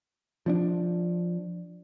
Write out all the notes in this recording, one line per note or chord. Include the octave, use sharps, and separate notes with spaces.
F3 C#4 D4